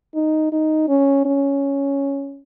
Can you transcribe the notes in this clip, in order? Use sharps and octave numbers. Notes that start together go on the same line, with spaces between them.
D#4
D#4
C#4
C#4